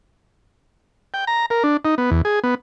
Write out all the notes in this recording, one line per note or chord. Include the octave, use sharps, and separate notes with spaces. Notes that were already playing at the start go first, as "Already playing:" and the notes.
G5
A#5
A#4
D4
D#4
B3
E2
G#4
B3